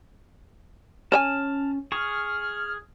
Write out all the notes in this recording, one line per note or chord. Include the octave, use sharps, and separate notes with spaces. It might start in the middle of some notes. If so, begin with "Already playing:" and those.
C#4 C#5 D#5 G#5 A5 F6
G#4 C#6 F6